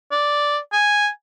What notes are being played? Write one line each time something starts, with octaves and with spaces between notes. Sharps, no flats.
D5
G#5